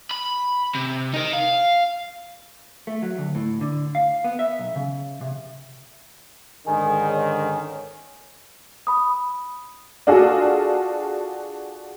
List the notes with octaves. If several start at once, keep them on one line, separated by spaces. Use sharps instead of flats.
B5
C3
D#4 A#4
F5
A3
F#3
D2
A2
D3
F5
B3
E5
B1
C#3
C3
G#2 D3 D#3 G#4
C#4
B5 D#6
D4 F4 F#4 G#4 A4